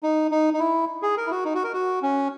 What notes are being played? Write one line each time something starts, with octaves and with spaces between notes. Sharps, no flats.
D#4
D#4
D#4
E4
G#4
A#4
E4
F#4
D#4
F#4
A#4
F#4
C#4